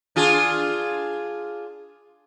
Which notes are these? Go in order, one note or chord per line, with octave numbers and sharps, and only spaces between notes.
D4 F4 G#4